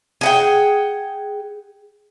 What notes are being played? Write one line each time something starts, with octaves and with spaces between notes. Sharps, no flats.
G#4 F#5 G5